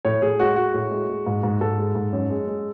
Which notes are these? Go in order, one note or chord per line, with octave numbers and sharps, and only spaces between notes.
A2 C#5
A2 G#4
G#3 F#4
G#3 F#4
A2
G#3
G#3
G#2
G#2
G#2 A4
G#3
G#2
F#2
G#3
G#3